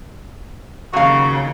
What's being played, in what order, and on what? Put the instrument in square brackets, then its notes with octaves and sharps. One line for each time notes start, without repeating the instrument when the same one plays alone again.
[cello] D#2 C#3 [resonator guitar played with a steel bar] F#3 F5 [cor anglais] F#4